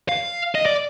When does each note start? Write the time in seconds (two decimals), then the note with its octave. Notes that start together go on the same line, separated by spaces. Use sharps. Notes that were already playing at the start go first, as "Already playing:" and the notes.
0.09 F5
0.55 D#5
0.66 D5